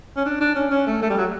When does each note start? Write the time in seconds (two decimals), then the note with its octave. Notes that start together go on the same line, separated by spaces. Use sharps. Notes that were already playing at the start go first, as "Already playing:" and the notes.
0.16 C#4
0.25 D4
0.40 D4
0.55 C#4
0.71 C#4
0.87 A3
1.02 A3
1.10 G3
1.18 F#3